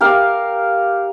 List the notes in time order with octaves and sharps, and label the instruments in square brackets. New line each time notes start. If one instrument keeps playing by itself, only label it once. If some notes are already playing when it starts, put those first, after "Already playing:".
[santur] G4 A#4 F5